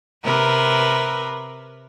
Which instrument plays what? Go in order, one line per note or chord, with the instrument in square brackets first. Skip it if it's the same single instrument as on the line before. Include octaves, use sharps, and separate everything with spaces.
[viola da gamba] C3 A#4 B4